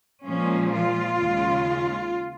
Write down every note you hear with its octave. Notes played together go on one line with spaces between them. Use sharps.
A#2 F3 G#3 C#4
F4
D#2 C#3 G#3